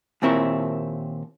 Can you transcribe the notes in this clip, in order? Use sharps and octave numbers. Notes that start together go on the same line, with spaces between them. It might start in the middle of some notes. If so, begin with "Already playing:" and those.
D#2 A#2 C4 E4 A#4 C#5